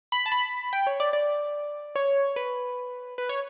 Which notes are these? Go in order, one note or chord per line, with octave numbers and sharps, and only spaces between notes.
B5
A5
B5
G5
C#5
D5
D5
C#5
B4
B4
C#5